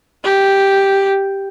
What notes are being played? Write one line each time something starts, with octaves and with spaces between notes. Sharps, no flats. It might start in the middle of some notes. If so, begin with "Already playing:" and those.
G4